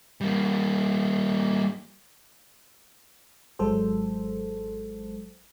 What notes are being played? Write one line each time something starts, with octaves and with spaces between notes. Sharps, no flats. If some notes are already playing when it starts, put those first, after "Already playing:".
G3 A#3
G#1 F#3 G#3 A4 C5